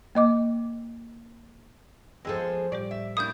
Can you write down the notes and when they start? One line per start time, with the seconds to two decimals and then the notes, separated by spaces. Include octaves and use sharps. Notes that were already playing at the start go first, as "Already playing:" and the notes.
0.15 A#3 D#5 D6
2.25 E2 F3 G#3 G#4 A4 G5 E6 A#6
2.72 A2 G3 G4 D5
2.91 E5
3.17 A2 A#3 D4 B5 D#6 G6